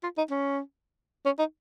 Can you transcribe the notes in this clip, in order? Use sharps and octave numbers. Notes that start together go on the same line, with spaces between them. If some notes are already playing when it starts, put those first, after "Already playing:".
F4
D#4
C#4
C#4
D#4